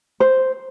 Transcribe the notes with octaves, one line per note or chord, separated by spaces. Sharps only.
C5